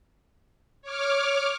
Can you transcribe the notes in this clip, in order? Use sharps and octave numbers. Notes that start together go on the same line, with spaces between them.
C#5 D6 F6